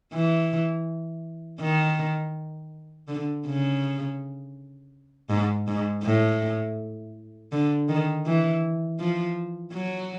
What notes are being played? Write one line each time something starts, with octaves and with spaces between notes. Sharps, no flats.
E3
D#3
D3
C#3
G#2
G#2
A2
D3
D#3
E3
F3
F#3